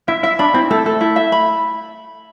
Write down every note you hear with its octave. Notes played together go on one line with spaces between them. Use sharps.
E4 E5
E4 E5
D4 B5
C4 E4
A3 A4
A3 A4
E4
E5
B5